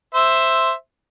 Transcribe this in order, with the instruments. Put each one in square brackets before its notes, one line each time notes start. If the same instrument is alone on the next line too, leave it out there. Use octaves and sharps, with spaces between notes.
[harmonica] C5 E5